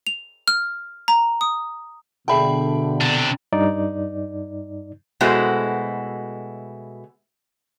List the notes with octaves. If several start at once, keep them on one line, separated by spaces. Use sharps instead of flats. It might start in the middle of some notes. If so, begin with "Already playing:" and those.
F7
F6
A#5
D#6
B2 D3 G#4 E5 G5 A5 B5
C3 D4
G2 D#4 D5
B2 G#3 A3 E4 F#4 C5